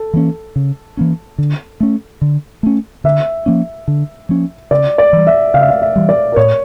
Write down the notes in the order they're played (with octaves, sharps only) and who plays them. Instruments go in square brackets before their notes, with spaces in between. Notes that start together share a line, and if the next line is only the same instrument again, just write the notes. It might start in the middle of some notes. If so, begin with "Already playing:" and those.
Already playing: [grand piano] A4
[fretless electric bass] E3 A#3 C#4
C#3
E3 A#3 C#4
D3
A3 C#4
D3
A3 C#4
[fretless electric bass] D3 [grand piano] E5
[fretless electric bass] F3 A#3 C#4
D3
F3 A#3 C#4
[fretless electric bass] C#3 [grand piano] D5
[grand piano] D5
[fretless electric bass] E3 G3
[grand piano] E5
[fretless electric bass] C#3 [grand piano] F5
[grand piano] E5
F5
E5
[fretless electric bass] E3 G3
[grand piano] D5
A#4
[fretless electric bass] A2 [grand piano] C#5